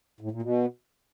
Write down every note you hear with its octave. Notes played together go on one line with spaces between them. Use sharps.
A2
A#2
B2